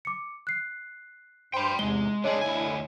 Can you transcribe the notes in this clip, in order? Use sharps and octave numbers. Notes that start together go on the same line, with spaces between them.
D6 C#7
F#6 C7
G2 C5 G5 B5 C6
E2 G#2 C3 G#3 G7
D3 G#3 D4 G#4 C#5 D#5
D2 D3 E4 G#5